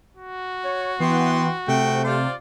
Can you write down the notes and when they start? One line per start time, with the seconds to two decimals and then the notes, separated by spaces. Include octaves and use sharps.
0.16 F#4
0.65 C#5
1.00 E3 B3 G5 C6
1.68 C3 A3 G5
2.04 F4 C5 D5